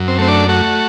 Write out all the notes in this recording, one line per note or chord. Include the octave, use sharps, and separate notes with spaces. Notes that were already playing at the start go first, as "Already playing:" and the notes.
Already playing: F#2
C4
A3 C4
D4
A3 F#4